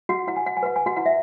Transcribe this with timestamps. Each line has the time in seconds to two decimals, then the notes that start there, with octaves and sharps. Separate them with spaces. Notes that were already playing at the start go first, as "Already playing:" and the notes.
0.09 F#4 F#5
0.27 E4 F#5
0.36 G#5
0.46 F#5
0.57 G#5
0.63 B4 F#5
0.76 G#5
0.86 F#4 F#5
0.97 E4 F#5
1.06 E5